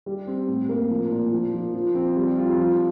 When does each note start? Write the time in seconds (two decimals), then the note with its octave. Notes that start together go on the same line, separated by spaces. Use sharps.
0.06 G3
0.27 C4
0.48 A2
0.69 A#3
0.90 F3
1.11 A#2
1.32 F3
1.53 F3
1.74 F3
1.95 C4
2.16 G3
2.37 F4
2.58 F3